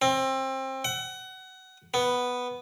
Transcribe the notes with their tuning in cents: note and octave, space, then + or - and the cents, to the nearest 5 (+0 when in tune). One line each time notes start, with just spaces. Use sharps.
C4 +25
F#5 +25
B3 +0